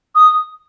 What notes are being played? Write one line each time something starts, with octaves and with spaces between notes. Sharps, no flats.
D#6